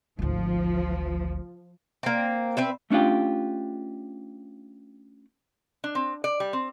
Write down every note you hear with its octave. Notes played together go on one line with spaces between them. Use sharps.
G#1 D2 F3
A#3 C4
C4 B4 E5
A3 C#4 D4 F4 G4
D4
C4
D5
G3
C4